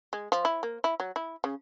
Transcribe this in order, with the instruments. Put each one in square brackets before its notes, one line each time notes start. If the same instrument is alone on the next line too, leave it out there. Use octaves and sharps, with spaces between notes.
[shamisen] G#3
F3
E4
A#3
E4
F#3
E4
C#3